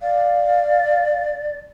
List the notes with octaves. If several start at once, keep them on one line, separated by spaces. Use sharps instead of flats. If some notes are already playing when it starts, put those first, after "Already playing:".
D5 F5